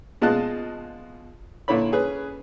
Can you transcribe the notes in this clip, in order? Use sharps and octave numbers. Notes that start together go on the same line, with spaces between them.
B2 G#3 F4 D#5 A5 F#6
A#2 D3 E4 C#5 B5
C#4 G#4 B4